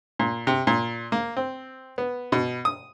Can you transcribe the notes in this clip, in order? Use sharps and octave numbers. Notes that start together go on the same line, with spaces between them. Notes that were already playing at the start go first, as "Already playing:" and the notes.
A#2
C3
A#2
A#3
C4
B3
B2
D#6